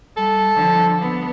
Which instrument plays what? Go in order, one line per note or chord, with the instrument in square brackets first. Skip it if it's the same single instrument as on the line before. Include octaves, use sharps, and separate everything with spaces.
[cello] G3 [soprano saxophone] A4
[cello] D3 F3
B3 D4